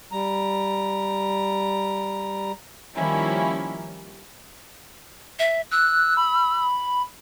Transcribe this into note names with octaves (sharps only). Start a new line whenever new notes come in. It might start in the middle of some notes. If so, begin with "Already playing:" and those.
G3 A#5
D#3 F3 G3 A#3 C#4 E4
E5
E6 F#6
B5